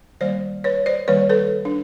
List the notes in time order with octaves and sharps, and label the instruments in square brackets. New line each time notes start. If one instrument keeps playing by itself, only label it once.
[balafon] D#3 G3 A#3 C5 D5
B4 C#5
C5 D5
D#3 G3 A#3 B4 C#5
A4 B4
D4